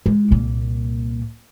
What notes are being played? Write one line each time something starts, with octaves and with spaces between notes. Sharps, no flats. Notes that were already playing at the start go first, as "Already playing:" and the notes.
G#3
C2 A#2